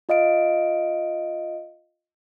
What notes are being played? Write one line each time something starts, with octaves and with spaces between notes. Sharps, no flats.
F4 D#5 F5 D7